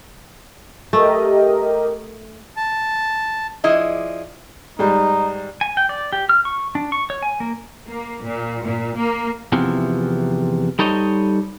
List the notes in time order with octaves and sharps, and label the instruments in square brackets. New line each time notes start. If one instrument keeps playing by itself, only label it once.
[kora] A3 [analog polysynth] G4 A#4 D#5
[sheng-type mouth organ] A5
[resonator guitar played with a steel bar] F3 E4 G#4 D5 D#5
[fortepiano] G#2 G3 [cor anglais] D#4
[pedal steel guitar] G#5
G5
D5
G4
F6
C#6
D4
C#6
C#5
G#5
A#3
[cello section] A#3
A#2
A#2
A#3
[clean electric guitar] E2 C3 E3 F3
G3 D#4 A4 C5 C#5 D#5